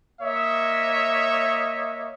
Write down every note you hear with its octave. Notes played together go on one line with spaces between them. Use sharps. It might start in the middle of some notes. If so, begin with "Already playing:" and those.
A#3 C#5 D#5 E5